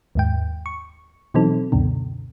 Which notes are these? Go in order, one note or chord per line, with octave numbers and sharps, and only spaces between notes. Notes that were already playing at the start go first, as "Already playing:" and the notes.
D#2 G#2 G5
C#6
B2 E3 F#3 C4 D#4 A4
C#2 F#2 B2 D3